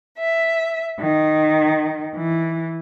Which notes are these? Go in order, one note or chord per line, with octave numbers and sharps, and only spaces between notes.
E5
D#3
E3